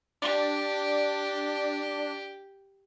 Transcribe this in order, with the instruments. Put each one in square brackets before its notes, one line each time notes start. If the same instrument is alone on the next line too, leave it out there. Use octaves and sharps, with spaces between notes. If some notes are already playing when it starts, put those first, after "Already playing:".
[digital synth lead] D4 [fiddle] G4